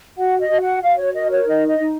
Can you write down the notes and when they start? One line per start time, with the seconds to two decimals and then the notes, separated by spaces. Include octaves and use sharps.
0.18 F#4 F#5
0.40 D#5
0.49 F#4
0.61 F#5
0.82 F#4 F5
0.98 C#5
1.14 A#4 D#5
1.30 C#5
1.47 D#4 D#5
1.68 D#5
1.79 D#4